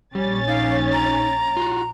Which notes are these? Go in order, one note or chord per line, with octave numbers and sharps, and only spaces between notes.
A#1 G3 C#4 A6
D#4 F5 D6
A#5
F4 F#4